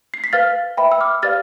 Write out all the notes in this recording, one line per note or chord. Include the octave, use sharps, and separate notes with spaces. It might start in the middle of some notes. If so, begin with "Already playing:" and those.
C7
B6
B4 F5 F6 A6
B4 E5 G5 B5
E6
D6 F6
G4 B4 D5 F5 F6 A6